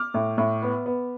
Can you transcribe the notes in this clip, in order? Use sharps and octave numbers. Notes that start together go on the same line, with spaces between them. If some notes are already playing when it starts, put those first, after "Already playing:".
Already playing: D6 F6
A2
A2
B3
B3